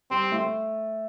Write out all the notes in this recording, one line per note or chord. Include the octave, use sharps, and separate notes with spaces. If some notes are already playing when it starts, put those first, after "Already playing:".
G3 C4
A3